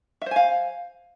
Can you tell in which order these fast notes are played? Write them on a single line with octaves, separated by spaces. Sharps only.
E5 C5 G#5 F5